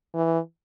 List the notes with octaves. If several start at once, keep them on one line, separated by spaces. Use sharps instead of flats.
E3